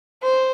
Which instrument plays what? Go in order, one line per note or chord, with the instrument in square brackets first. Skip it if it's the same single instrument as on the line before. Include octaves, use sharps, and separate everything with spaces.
[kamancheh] C5